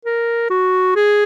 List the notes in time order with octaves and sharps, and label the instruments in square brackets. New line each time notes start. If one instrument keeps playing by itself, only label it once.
[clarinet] A#4
F#4
G#4